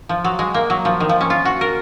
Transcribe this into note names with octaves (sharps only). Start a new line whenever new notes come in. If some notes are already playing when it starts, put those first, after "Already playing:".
F3
F#3
G#3
A#3
F#3
F3
D#3
F3
C#4
F4
F#4
A#4